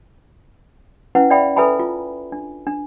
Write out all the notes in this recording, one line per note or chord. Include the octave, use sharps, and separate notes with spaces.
C#4 E4 B4 F#5
D5 E5 F5 G5 B5
A4 B4 E5 G#5 A#5 B5
F4
D4
D4